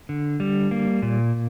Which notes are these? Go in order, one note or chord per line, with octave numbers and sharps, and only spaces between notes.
D3
G3
A#3
A#2